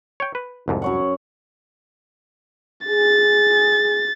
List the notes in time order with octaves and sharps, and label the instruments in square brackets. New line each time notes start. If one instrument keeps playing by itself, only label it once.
[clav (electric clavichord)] C#5 G5
B4
C2 F2 G#2
[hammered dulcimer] F#2 C#5 F#5
[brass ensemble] G#4 [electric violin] A6